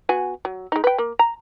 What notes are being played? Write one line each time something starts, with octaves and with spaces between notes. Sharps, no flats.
B3 F#4 G#5
F#3
G#3 D#4
B4 G5
A#3
A#5